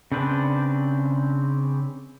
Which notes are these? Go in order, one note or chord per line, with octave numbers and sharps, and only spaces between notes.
C#3 C4 D4 B4 C5